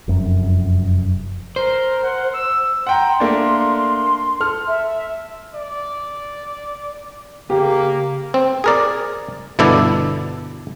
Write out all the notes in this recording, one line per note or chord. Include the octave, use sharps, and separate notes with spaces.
F1 F#2
A#4 C5
F#5
E6
F#5 G5 A#5 C6
A3 A#3 D4
A4 F6
E5
D5
C#3 A#3 G4
C4
G#4 A#4 D5
G1 B2 D3 E4 A4 D5